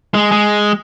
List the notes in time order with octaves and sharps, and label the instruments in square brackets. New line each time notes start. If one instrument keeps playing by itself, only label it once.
[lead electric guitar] G#3
G#3